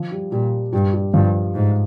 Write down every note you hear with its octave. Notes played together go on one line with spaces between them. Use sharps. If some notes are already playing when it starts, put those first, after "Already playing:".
Already playing: F3
G3
A#2 G3
G2 G3
G3
G2 F3
G#2